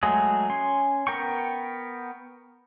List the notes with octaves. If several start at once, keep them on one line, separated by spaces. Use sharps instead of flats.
F#3 G#3 A3 G#4
C#4 G#5 C6
B3 A#4 G5 C#6